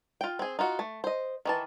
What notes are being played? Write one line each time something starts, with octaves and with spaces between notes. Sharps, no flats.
F4 G5
C4 G#4
D#4 F4 F#4
A3
C5 D#5
D#3 E3 A5